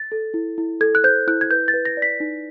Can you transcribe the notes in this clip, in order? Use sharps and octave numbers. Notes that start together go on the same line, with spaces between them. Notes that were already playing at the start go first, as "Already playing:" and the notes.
Already playing: A6
A4
E4
E4
A4 G#6
F#6
C5 G6
E4 F#6
G#6
B4 G6
A6
B4
A#6
D5
B6
D#4